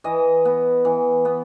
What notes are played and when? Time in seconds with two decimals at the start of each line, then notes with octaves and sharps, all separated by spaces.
0.04 E3 D#5
0.45 B3
0.85 E3
1.25 B3